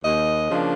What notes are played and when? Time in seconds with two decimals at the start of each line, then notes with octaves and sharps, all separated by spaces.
0.03 D#2 D#5
0.50 C#3 F3 A#3 D4